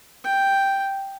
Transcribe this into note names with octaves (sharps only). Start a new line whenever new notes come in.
G5